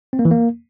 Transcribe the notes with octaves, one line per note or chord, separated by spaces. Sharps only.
C4
A#3
E3
A#3